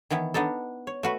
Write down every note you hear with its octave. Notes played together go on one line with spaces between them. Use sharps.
D#3 E3 B3 E4
B3 D4 D#4 A4
C#5
A3 F#4 B4